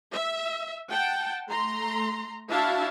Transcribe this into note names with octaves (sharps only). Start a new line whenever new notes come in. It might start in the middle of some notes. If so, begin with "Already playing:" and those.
E5
F#5 G5 A5
A3 A#5 C6
D4 E4 F#4 E5 F5 A5